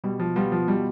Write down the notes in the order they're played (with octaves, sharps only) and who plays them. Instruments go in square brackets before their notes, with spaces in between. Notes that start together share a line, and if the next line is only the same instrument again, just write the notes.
[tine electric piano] B2 [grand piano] G3
[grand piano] F3
[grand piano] G3 [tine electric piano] B3 F4
[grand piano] F3
[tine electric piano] B2 [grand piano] G3